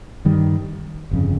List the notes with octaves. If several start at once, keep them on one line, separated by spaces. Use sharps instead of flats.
G2 D#3 G3
G1 F2 C#3